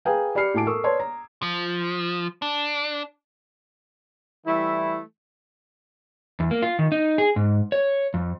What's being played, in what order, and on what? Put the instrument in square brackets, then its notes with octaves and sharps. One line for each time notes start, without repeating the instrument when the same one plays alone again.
[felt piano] G#4 B4 F5 G5 G#5 A#5
G4 D5 B5 F6 C7 C#7
A2 F#4 G#5 A5 D6 D7
A4 A#4 C#6 D#6 E6
B4 C#5 D5 A5 C6 G#6
A#5
[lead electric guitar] F3
D4
[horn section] E3 G3 A3 E4
[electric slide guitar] E2
A#3
F4
D#3
D#4
G#4
G#2
C#5
F2